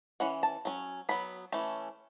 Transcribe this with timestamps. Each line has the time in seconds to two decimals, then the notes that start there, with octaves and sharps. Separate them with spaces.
0.20 E3 C#4 F#5
0.43 A5
0.65 F#3 C#4
1.09 F#3 B3 B5
1.52 E3 A3 C#4